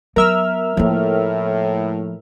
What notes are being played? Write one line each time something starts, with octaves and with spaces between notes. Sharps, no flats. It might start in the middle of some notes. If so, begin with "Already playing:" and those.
F#3 B3 A#4 E5 F6
A2 F3 A#3